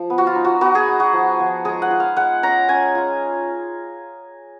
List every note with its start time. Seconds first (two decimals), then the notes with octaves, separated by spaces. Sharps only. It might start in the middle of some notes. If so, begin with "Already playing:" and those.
Already playing: F3
0.10 B3
0.18 F#4
0.27 F4
0.35 D#4
0.45 F#4
0.61 B3 F#4
0.75 G#4
0.88 D#4
1.00 F#4
1.13 F3
1.40 F3
1.65 G#3 G#4
1.82 F#5
1.90 F4
2.00 F5
2.17 G#3 F#5
2.43 C#4 A#5
2.68 C#4 G#5
2.95 F4